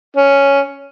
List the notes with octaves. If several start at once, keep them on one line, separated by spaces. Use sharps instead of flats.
C#4